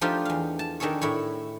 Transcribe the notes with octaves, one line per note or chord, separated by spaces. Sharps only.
F3 A3 D4 D#4 F4 G4
E2 F5
A5
D#3 D4 G#4 A4 C#5
A2 E4 C#5